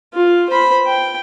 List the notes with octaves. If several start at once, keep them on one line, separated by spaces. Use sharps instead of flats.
F4
C5 B5
G5